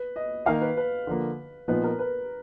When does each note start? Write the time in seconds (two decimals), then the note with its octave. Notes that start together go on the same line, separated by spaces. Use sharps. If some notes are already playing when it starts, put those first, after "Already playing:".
Already playing: B4
0.16 D#5
0.46 D#3 A#3 D#4 F5
0.62 B4
0.77 B4
1.07 D3 F3 A#3
1.68 A#2 F3 B3 D#4 B4
1.83 A#4
1.99 B4